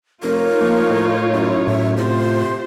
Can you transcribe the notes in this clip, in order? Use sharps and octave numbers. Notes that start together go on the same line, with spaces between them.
F1 D#4 F4 A#4 C#5
F3 A#3
A2
F#2 E4
A2 E5
C3 F4 C5